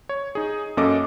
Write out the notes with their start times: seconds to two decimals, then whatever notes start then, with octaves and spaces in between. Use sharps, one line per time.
0.09 C#5
0.35 D#4 G#4
0.77 F#2 A#3 C#4 A4 D#5 D6